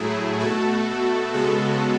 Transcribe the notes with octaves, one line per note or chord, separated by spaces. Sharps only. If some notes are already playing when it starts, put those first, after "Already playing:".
Already playing: A2 F#3 A3 E4 G#4
B2 A3 F#4 A4
B2 A3
C#3 G#3 B3 F#4 A4